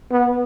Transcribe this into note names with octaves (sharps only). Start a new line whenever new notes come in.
B3